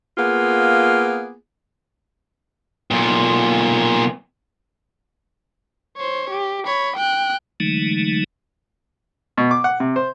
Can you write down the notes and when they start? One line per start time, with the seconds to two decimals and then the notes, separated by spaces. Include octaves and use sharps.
0.17 A#3 B3 F4 G#4
2.91 B1 A#2
5.97 C5 C#5
6.30 G4
6.66 C#5 B5
6.96 G5 F#6
7.60 D3 E3 F#3 G#3 A3 D#4
9.37 B2
9.51 D6
9.64 F#5
9.80 C3
9.96 C5